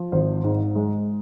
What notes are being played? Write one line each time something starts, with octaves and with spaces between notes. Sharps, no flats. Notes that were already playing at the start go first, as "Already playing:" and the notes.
Already playing: F3
G#1 C5
G#2
G#3